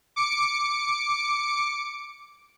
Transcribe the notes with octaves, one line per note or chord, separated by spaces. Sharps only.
D6 C#7 D7